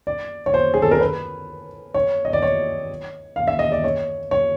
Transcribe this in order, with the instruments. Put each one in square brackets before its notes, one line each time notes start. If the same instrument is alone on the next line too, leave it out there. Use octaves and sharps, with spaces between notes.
[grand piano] D5
C#5
C5
G#4
A4
A#4
B4
C#5
D#5
D5
C#5
F5
E5
D#5
D5
C#5
C#5